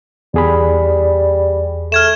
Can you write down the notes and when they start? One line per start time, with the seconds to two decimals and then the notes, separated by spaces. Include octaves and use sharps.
0.34 E2 G3 G#4 B5
1.92 A3 F6 G#6 E7